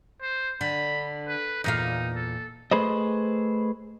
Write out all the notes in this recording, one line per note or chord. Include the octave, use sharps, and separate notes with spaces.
C5
D3 B5
B4
E2 A#2 D#4 F5
A4
A3 G#4 B4 C5 D#5